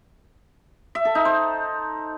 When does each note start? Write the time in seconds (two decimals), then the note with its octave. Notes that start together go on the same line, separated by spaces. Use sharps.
0.95 E5
1.05 A4
1.15 D#4
1.25 C5